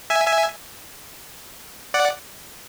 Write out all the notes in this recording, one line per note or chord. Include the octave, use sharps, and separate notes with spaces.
E5 G#5
E5 G#5
D5 F#5